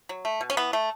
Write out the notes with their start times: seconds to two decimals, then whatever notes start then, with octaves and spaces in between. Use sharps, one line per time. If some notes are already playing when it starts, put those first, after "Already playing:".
0.09 F#3
0.25 A3
0.41 B2
0.50 C#4
0.57 E3 B3
0.73 A3